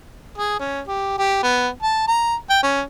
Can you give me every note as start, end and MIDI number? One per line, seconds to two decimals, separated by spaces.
0.38 0.59 68
0.60 0.81 61
0.87 1.16 67
1.18 1.39 67
1.43 1.69 59
1.82 2.05 81
2.07 2.35 82
2.50 2.60 79
2.63 2.81 61